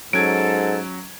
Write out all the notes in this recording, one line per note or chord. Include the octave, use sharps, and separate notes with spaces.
G#2 F#3 C#4 A4 G#6 D7